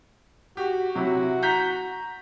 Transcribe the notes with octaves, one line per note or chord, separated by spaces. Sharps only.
F#4 G4
C3 F#3 E4 F#4
A#5 G6 B6